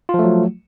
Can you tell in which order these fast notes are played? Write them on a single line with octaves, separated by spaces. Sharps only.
F4 F3 A3 F#3